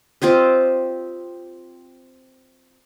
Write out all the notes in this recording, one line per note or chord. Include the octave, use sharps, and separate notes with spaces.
C4 F4 G4 D#5